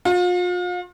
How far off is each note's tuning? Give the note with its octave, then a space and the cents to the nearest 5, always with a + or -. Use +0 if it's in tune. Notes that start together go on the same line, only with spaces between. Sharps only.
F4 +40